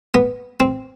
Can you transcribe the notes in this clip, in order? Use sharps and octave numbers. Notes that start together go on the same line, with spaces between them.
B3
C4